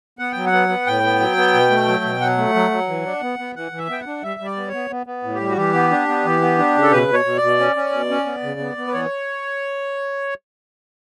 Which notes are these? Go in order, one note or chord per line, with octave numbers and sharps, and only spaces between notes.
B3 F#5
F#3 G5
F#5
B3
B3
A2 G5
B3
F#3
B3
B2
A3
F#3
B2
F#3 F#5
A3
F#3
F#3
E3
D4
B3
B3
E3 F#5
E3
E5
B3 G5
F#5
D4
G3 E5
G3
D5
B3
C#5
B3
B3
B3
A2
G4
G3
F#4
E3 G4
B3
D4
B3
E3
B3
D4
C#3
A4
B2 B4
B2
C#5
B2
D5
B2
C#4
C#4
B2
C#4
B3
C#3
B3
B3
B4
E3 C#5